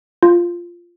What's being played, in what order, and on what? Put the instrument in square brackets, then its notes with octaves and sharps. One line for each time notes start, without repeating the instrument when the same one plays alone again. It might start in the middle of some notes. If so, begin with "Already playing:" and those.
[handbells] F4